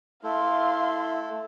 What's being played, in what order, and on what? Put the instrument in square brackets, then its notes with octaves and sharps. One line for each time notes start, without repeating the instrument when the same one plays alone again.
[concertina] A3 [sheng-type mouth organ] E4 [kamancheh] F5 C6